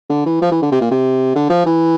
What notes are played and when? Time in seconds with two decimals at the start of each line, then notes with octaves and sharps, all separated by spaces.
0.10 D3
0.26 E3
0.41 F3
0.51 E3
0.62 D3
0.72 C3
0.81 A#2
0.91 C3
1.35 D3
1.50 F3
1.66 E3